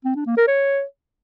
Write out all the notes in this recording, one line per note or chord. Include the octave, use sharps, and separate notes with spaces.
C4
D4
A#3
A#4
C#5